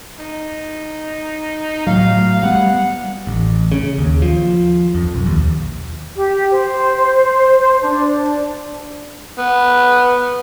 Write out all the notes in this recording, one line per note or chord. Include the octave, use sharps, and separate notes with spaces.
D#4
A2 F#3 F5
G3 B3 F#5
A1
C#3
D#2
F3
F2
B1
D#2
G4
C5
D4
B3